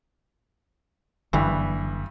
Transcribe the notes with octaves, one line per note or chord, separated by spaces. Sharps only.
F#1 G2 D3 E3